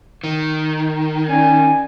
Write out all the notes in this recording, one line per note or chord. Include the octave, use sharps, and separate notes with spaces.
D#3
C#4 D5 G#5